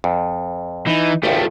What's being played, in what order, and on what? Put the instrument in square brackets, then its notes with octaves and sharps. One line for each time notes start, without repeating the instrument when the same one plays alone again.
[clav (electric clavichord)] F2
[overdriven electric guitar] E3 [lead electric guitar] D#4
[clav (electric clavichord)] G#1 C#2 [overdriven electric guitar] F3 A3 [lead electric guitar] G4